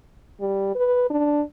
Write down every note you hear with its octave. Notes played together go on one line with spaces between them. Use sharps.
G3
B4
D4